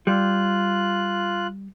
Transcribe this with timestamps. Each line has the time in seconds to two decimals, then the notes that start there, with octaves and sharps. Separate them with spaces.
0.07 G3 F4 F#6